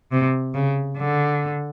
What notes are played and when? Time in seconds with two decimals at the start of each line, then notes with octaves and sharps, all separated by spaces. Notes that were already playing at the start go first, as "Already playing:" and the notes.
0.12 C3
0.55 C#3
0.98 D3